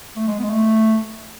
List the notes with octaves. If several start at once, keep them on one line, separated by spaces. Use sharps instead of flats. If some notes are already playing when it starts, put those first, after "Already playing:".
A3
G#3
B3
G#3
A3